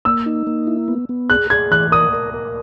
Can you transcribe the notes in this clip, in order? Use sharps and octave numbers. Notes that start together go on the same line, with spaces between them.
A#3 E6
D#4
A#3
E4
B3
B3
G#4 F#6
G#4 G#6
E3 F#6
A#4 D#6
A#4
A#4